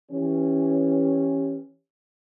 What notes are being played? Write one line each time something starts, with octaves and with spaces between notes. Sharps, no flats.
E3 C#4 G4